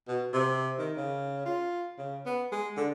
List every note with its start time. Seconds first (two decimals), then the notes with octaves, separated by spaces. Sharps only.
0.07 B2
0.33 C3
0.78 D#3
0.97 C#3
1.45 F4
1.98 C#3
2.26 B3
2.52 G#3
2.77 D3